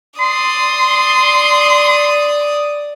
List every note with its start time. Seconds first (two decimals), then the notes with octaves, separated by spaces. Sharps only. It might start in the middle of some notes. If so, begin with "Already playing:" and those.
0.20 D5 C6 D#6